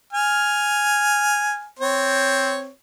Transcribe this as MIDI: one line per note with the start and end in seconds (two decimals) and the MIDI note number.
0.13 1.65 80
0.13 1.65 89
1.79 2.69 60
1.79 2.69 73